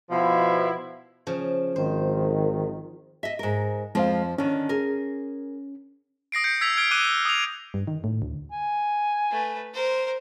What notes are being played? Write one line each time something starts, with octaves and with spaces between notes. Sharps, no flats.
B2 F3 E4
C#3 F3
G#1 D#3 C5
D#5 E5
G#2 A#4
F2 F3 G#3 C4 C5 F5
D3 D#3 C#4
G#4 A#4
D#6 A#6 C7 D7
G6 C7 C#7
E6 G#6 B6 F7
F6 G#6 D7 G7
D6 F#6 D#7 G7
D#6 F7
G2
D#3
A2
D2
G#5
A3 B4
A#4 C5